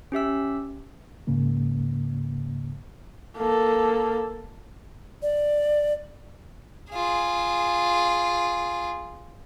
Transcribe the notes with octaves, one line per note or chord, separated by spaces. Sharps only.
C#4 G4 E5 E6
C#2 G#2 C#3 A#3
A#3 A4
D5
F4 G#4